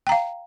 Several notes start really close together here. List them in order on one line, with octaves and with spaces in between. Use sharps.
G5 A#5 F5